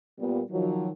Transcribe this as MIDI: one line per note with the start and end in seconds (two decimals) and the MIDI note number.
0.19 0.41 46
0.19 0.41 55
0.19 0.41 59
0.51 0.90 51
0.51 0.90 53
0.51 0.90 54